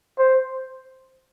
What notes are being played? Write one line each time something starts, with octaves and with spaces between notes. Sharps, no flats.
C5